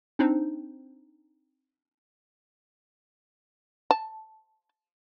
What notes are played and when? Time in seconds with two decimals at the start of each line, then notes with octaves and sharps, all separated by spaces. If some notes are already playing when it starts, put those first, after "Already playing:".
0.19 C4 D4 D#4 C5
3.91 A5